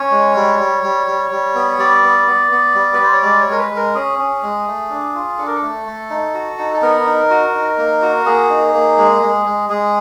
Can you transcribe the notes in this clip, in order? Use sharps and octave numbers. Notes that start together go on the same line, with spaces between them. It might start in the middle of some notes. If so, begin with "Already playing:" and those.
Already playing: C#4 C#5
G#3
G3
G3
G3
G3
G3
B3
G3 D5
B3
B3
B3
G3
B4
G3 C5
C#5
G#3 D5
C#5
G#3 A#4
B4
G#3
A#4
C#4 G#4
C#4
G#3
A3
D4
F4
D4 A4
A#4
A4
A3
A3
D#4
F#4
D#4
A4
B3 A#4
D#4
F#4
D#4
A#3
F#4
A#3 G#4
D#4
A#3
G#3
G#3
G#3
G#3 G#4